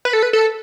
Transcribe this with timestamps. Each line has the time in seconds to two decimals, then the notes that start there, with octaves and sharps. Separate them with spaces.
0.05 B4
0.13 A4
0.23 B4
0.33 A4